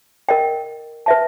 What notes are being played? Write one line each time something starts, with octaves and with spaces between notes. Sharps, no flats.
A#4 D#5 G5
B4 E5 A5